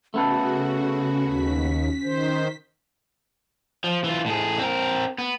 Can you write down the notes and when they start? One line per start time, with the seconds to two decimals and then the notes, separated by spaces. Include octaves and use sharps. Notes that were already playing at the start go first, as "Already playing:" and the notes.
0.14 C#3 A3 B3 C#4 F#4 A4
1.25 D#2 B6
2.03 D#3 C5
3.84 F3
4.04 E3 F4
4.26 A2 G#4
4.59 C4 A#4
5.18 B3